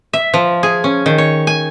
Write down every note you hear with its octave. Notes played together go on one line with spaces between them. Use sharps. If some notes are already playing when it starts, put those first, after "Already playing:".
E5
F3
G#4
C#4
D#3
C#5
G#5